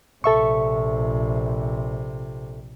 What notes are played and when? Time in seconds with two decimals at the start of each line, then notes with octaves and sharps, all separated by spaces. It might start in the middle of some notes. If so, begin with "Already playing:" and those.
0.24 A#1 C3 A4 E5 C#6